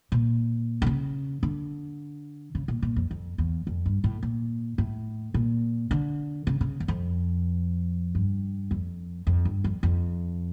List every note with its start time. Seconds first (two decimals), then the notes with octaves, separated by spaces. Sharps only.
0.12 A#2
0.82 D3
0.87 C#3
1.43 D3
2.55 C#3
2.68 A#2
2.82 A#2
2.96 F2
3.11 F2
3.38 E2
3.67 F2
3.86 G2
4.04 A2
4.23 A#2
4.78 A2
5.34 A#2
5.91 D3
6.47 C#3
6.61 C#3
6.80 E2
6.88 F2
8.15 G2
8.71 F2
9.27 F2
9.45 G2
9.64 F2
9.83 F2